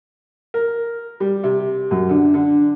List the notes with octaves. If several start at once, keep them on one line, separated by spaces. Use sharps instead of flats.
A#4
G3
C3
F#2
D3
D3